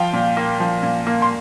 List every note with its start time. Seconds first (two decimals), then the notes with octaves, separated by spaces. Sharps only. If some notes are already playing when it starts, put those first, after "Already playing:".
Already playing: F3 F5 G5
0.13 A#2
0.37 A#3
0.60 F3
0.83 A#2
1.07 A#3
1.22 C6